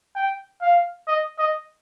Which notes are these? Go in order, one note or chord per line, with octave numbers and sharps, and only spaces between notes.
G5
F5
D#5
D#5